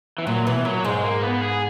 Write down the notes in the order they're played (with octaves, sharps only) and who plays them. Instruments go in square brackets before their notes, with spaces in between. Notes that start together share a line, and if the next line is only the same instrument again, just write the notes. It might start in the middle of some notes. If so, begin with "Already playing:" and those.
[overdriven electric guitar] E3
[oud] A#2 [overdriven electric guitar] F#3
[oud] B2 [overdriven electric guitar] E3
[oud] A#2 [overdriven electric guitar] F#3
[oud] G#2 [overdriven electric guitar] G#3
[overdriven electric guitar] A#3
B3
G#4